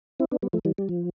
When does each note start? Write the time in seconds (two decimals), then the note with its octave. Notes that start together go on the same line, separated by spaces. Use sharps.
0.20 C4 E4
0.31 B3 D4
0.42 G3 B3
0.53 F3 A3
0.65 E3 G3
0.78 G3
0.89 F3